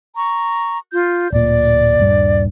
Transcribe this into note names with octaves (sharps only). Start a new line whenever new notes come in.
A#5 C#6
F4 G6
D1 A#2 D5
D#1 G2